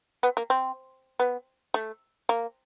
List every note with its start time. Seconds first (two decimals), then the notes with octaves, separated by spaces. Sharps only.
0.23 B3
0.37 A#3
0.50 C4
1.20 B3
1.74 A3
2.29 A#3